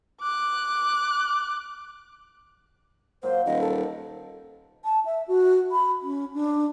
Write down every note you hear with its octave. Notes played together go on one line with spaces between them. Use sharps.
D6 F#6
A#2 F#3 C5
D#1 D#5
A4
A5
E5
F#4
B5
C#4
D4